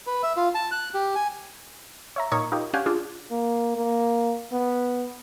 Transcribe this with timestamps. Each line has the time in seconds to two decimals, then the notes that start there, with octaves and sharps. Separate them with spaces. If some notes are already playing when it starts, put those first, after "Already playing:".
0.07 B4
0.23 E5
0.36 F4
0.55 A5
0.71 F#6
0.94 G4
1.15 G#5
2.16 C#5 E5 A#5
2.32 A#2 D#4 A#4 C#5
2.52 D#4 F4 G4 A#4
2.74 C#4 D4 G4 F5 F#5 G#5
2.86 D4 F4 G#4
3.31 A#3
3.76 A#3
4.52 B3